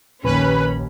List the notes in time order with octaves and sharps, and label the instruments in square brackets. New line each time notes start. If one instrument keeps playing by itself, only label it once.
[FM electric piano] A#1 [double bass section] D#2 [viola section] C#4 B5 [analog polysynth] B4